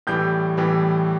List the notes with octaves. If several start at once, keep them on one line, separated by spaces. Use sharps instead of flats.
A2 E3 G3 G6
A2 E3 G3